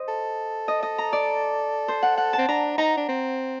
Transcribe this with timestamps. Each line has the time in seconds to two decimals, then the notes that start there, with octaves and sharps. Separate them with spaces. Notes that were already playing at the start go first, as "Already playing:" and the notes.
Already playing: C5 D#5
0.08 A4
0.68 D#5
0.83 D#5
0.98 A#5
1.13 D5
1.88 C5
2.03 F#5
2.18 F#5
2.33 A5
2.38 C4
2.48 D4 A#5
2.78 D#4 A#5
2.97 D4
3.08 C4